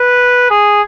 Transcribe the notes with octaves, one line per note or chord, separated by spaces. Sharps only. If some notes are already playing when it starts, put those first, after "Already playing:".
Already playing: B4
G#4